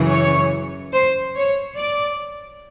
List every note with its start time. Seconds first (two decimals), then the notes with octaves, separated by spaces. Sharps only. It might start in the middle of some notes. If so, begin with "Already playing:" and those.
Already playing: F#2 C#3 E3
0.10 C#5
0.93 C5
1.36 C#5
1.77 D5